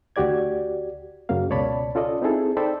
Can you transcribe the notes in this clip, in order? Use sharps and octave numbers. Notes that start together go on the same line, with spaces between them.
D2 F#4 G4 D5 G#6
F#2 C#3 F#3 A#3 F5
C#2 B2 C#5 D5 A5 B5
C#4 F4 A4 D5 D#5
C4 D#4 E4 G#4 A4
D#4 A4 C5 D5 G5 B5